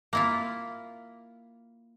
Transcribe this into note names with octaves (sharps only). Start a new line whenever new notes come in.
A#3 E4 F4